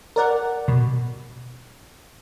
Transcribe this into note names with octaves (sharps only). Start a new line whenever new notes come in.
A#4 D5 F#5
B2